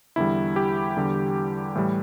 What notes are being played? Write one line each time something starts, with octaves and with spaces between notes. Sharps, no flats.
E2 D3 G3 E4
G4
E2 D3 G3
A2 E3 G3